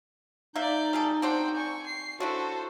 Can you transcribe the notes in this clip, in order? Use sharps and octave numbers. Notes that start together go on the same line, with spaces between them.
A#3 D#4 D5 E5 G6
G3 G#4 A4
C4 D4 F#4 C5 G5
G#5 C#6
C7
D3 D4 E4 F#4 A4 C5